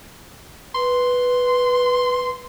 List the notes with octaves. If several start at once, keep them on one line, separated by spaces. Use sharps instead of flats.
B4 C6